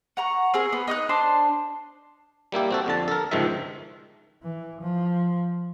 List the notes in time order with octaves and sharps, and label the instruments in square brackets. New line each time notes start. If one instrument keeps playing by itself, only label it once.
[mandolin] F#5 A#5 C#6
C4 G#4 A#4
B3
D#4 D#5 D#6 F#6
D4 C5 A5 C6
[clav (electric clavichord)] G3 A#3 E4 G4
C4 F#4 A4
F2 D3 A5
A4 A#4
G1 C#2 G#2 D#3 F3 E5
[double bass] E3
F3